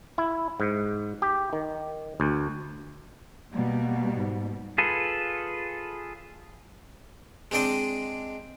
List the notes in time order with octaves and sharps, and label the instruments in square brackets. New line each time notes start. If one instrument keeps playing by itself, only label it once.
[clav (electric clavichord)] E4
G#2
G4
D#3
D2
[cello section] B2 G3 [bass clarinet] A#3
[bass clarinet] G#2
[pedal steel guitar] F4 G#4 A4 B4
[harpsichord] G#3 C4 D4 D5 D#5